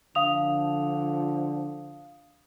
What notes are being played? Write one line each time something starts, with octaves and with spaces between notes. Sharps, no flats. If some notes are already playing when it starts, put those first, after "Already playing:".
D3 F3 F5 D#6 F7